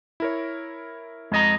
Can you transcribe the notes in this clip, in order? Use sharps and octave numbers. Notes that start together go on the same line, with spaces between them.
E4 A#4 C#5
F2 G#3 D#5 A#5 D#6